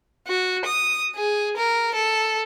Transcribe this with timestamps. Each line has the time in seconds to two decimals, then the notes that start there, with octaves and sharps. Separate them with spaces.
0.28 F#4
0.66 D#6
1.16 G#4
1.57 A#4
1.95 A4